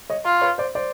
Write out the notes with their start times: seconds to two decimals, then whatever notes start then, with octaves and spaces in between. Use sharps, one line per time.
0.10 C#5 D#5
0.26 F4
0.42 B4 C#5
0.58 C5 D5
0.75 C5 D5